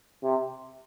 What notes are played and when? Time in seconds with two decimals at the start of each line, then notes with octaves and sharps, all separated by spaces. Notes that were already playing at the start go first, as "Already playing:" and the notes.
0.23 C3